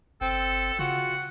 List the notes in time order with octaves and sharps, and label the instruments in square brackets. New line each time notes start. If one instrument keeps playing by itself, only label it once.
[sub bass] G1 [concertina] C4 G5 [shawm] A4
[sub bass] C#3 [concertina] F4 F#4 [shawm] F#5